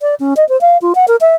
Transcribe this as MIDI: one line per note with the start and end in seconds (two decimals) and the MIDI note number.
0.01 0.15 74
0.20 0.34 61
0.37 0.47 75
0.49 0.59 72
0.61 0.78 77
0.82 0.93 65
0.95 1.06 78
1.08 1.16 70
1.21 1.35 76